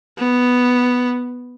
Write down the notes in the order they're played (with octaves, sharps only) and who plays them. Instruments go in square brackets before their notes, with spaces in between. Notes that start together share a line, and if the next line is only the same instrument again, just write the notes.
[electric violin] B3